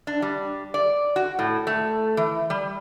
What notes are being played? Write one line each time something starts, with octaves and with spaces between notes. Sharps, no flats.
D4
G3
D5
F#4
A2
A3
E3
G3